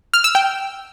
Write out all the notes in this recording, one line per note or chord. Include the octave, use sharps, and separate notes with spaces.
F6
E6
G5